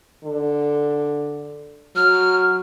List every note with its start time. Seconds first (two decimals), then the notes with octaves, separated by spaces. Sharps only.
0.24 D3
1.96 F#3 F6